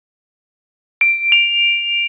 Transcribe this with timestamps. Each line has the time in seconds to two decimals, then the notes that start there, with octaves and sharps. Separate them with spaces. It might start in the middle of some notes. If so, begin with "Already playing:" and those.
1.01 D7
1.32 F7